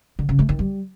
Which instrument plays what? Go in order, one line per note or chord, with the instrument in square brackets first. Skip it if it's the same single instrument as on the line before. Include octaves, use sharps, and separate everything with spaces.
[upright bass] D3
C#3
A3
D#3
G3